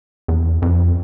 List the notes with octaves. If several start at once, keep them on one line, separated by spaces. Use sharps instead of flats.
E2
F2